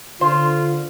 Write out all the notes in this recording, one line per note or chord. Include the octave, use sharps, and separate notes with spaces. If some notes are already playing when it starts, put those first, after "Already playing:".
D3 F4 C5